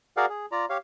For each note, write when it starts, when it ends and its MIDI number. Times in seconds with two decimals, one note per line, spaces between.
0.17 0.26 66
0.17 0.26 68
0.17 0.26 70
0.17 0.26 74
0.17 0.26 77
0.17 0.26 78
0.29 0.46 68
0.52 0.66 65
0.52 0.66 74
0.52 0.66 82
0.70 0.78 67
0.70 0.78 73
0.70 0.78 77